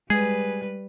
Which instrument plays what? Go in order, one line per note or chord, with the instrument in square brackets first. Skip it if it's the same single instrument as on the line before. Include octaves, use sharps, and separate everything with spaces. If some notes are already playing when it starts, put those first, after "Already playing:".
[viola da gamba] G3 B4 [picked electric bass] G#3 [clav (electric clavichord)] G#4